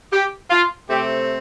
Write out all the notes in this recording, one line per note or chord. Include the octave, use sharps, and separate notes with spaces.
G4
F4
C3 A3 C4 G4